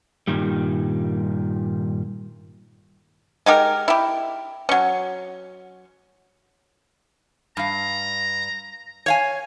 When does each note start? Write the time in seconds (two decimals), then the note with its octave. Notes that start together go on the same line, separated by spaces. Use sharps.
0.28 G2 A#2 D#3 G3
3.46 G#3 D#4 G4 A#4
3.88 E4 G4
4.69 F#3 C#4
7.57 G2 F5 A#5
9.06 C#5 F5 G#5